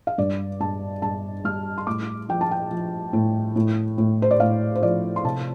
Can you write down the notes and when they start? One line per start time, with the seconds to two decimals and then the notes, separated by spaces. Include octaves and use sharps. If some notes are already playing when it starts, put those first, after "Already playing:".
0.07 F5
0.18 G2 D5
0.60 G2 A5
1.02 G2 A5
1.44 G3 F6
1.78 C6
1.87 A2 D6
2.29 F3 G5
2.41 A5
2.51 G5
2.71 F3
3.13 A2
3.56 A2
3.98 A2
4.22 C5
4.31 D5
4.40 A2 F5
4.75 C5
4.82 F3 D5
5.16 C6
5.24 C3 A5